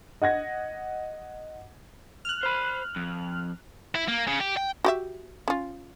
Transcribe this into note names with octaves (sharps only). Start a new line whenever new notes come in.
D#5 F#5 G#6 A#6
F6 F#6
C5 B5
F2
E4
A#3
C#3
G4
G5
F#4 G4 E5
C#4 F4